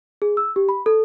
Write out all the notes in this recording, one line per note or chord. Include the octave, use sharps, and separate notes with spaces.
G#4
E6
G4
B5
A4